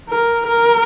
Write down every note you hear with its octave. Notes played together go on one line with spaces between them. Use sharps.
A#4
A#4